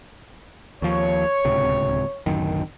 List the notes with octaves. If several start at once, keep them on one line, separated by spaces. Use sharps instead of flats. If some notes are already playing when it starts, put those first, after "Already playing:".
D#2 F3 C#5
D1 C#2 C3
D1 F#2 D#3